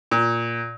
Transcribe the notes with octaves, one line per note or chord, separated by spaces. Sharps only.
A#2